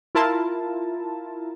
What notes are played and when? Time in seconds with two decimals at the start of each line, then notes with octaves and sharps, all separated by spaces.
0.15 E4 F4 A#4 A5